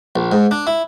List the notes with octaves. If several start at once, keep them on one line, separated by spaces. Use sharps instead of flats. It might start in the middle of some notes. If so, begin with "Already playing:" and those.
A#1
G#2
D4
E4